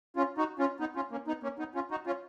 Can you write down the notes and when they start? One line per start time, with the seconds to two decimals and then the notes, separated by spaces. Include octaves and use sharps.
0.16 C#4 F4
0.38 D#4 F#4
0.59 C#4 F4
0.80 B3 D#4
0.96 C#4 F4
1.11 A#3 C#4
1.27 B3 D#4
1.43 A#3 C#4
1.59 B3 D#4
1.75 C#4 F4
1.91 D#4 F#4
2.06 C#4 F4